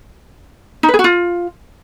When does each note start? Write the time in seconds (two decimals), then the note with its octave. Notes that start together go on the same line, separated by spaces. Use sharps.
0.83 D#4
0.88 B4
0.94 G#4
0.99 F#4
1.04 F4